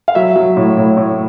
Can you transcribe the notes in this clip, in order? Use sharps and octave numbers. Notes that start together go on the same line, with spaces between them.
F5
F#3 E5
F#3
A2
A2
A2